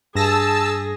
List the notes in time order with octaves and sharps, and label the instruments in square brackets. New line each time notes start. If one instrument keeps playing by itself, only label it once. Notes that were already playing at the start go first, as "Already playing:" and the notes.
[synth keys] G2 A#6 [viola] G#4 [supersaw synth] A5 E6